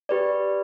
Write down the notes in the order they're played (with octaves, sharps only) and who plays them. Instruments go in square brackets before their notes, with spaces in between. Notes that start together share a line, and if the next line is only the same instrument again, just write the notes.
[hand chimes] G4 B4 D5